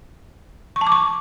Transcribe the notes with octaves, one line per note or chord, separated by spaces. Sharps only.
C#6
A5
D6
C#6